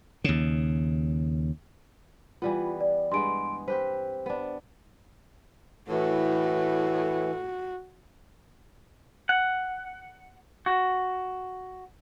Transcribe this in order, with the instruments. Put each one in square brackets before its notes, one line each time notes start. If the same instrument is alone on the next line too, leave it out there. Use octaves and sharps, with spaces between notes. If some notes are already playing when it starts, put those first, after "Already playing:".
[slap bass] D#2 C#3
[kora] E3 G3 B3 [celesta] F4
[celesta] D5
[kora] G2 G#3 B3 [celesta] C6 D7
[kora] C4 G4 B4 [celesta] C5
[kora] B3 D4
[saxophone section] A2 [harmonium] E3 [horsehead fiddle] F#4
[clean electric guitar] F#5
F#4